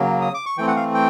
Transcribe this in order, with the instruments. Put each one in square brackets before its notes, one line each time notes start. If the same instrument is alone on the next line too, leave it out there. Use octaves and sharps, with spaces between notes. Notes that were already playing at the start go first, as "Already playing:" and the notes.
Already playing: [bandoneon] C#3 F#3 A#3
D#6
D6
C#6
E3 A3 C4 G5
F#5
F5
G5